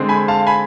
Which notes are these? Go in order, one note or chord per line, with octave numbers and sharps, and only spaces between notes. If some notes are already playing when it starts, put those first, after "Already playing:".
Already playing: D3 G#3 C4
G#5 B5
F5 A5
G#5 B5